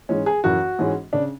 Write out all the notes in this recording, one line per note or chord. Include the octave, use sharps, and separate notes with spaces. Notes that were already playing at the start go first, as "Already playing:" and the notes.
G#2 E3 G#3 C#4
G#4
F#1 F#2 E3 F#4
G#2 E3 G#3 C#4
C#3 D4